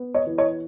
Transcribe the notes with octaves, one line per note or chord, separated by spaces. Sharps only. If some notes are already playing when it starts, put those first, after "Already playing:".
Already playing: B3
C#5 D#5
E3
C#5 D#5